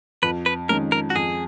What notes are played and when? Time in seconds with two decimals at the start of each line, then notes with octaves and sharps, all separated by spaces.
0.22 F2 B4
0.46 B4
0.69 D#3 G#3 C#4 A#4
0.92 A#4
1.10 F#4
1.15 F2 G#4